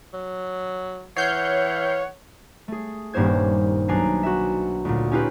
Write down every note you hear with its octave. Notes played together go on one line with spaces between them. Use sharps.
F#3
E3 C#5 F#5 F6 G6 C7
A3 G#4
D#1 G2 A#3 C#4 C5 G#6
B1 D4 G#5 A#5 C7
F#4 E5
D2 A#2
C#4 D#4 F4 G4 B4